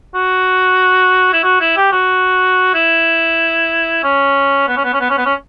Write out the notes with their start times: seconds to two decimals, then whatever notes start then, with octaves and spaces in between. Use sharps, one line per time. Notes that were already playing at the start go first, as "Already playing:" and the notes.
0.14 F#4
1.33 E4
1.43 F#4
1.60 E4
1.77 G4
1.92 F#4
2.74 E4
4.03 C#4
4.68 B3
4.77 C#4
4.84 B3
4.93 C#4
5.00 B3
5.10 C#4
5.17 B3
5.26 C#4